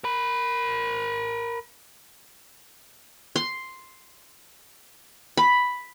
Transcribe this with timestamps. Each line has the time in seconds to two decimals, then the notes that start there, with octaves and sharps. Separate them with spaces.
0.04 A#4 B5
3.36 C6
5.37 B5